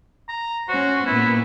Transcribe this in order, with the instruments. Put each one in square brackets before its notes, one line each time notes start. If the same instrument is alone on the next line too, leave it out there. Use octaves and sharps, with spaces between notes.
[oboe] A#5
[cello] C#4 C5 [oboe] F#4
[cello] A#2 B3 [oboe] E4